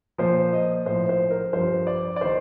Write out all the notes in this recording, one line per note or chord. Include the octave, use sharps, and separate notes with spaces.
A#2 F3 C5
D#5
A2 F3 C5
C5
A#4
G2 F3 C5
D5
D5
D#3 C5